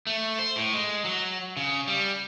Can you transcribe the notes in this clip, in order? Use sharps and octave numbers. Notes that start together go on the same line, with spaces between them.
A3
C5
A2
G#3
F#3
C#3
G3